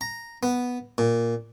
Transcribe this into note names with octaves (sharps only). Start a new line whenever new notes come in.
A#5
B3
A#2